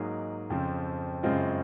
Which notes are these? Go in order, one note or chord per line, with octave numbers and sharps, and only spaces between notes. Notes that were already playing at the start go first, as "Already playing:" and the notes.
Already playing: G#2 F#3 A#3 D#4 G#4
F2 C#3 F3 C4
F#2 C#3 G#3 C4 F4